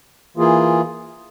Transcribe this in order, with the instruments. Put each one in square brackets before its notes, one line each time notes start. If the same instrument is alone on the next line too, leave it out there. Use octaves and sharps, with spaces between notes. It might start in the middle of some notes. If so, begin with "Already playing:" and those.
[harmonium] E3 A#3 F4 G#4